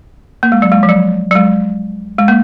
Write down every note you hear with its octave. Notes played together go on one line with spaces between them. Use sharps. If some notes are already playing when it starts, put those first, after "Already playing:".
A#3
G#3
F#3
G#3
F3
F#3
F#3
G#3
G#3
A#3